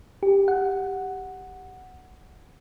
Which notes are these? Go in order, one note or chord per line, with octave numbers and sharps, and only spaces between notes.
G4
F#5